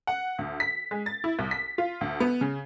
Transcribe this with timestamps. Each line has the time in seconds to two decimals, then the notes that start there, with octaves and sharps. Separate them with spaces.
0.07 F#5
0.39 D2
0.60 B6
0.91 G#3
1.06 A6
1.24 E4
1.39 C2
1.51 B6
1.78 F4
2.01 D2
2.20 B3
2.41 C#3